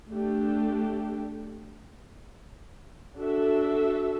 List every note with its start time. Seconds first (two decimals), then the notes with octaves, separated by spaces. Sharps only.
0.10 A3 D4 G4
3.16 D4 F#4 A4 E5